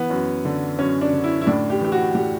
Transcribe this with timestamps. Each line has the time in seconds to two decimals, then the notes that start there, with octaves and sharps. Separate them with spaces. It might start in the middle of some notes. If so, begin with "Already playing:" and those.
Already playing: E3 B3
0.10 F#2
0.45 D3
0.79 F#2 C#4
1.01 D4
1.13 D3
1.24 E4
1.41 E4
1.47 A2 D4
1.70 G4
1.81 E3 G4
1.92 F#4
2.15 A2 G4